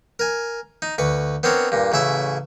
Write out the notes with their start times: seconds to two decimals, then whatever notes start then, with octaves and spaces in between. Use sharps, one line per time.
0.19 A#4 G#5
0.82 D#4
0.98 D2 B4 C#6
1.43 B3 C4 D4 A#4 C#5
1.72 G2 A#2
1.92 A1 C#3 E4 E5